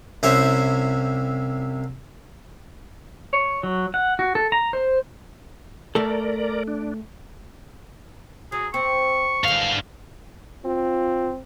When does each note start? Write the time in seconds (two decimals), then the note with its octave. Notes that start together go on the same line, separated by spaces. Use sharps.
0.23 C2 C3 C#4 E4 C5 C#5
3.33 C#5
3.63 F#3
3.94 F#5
4.19 F#4
4.35 A4
4.52 A#5
4.73 C5
5.95 A3 A4 A#4 D5
6.68 D4
8.52 F#3 G#4
8.74 C4 C#6
9.44 G2 D3 E3 G#3 F5
10.65 C4 F4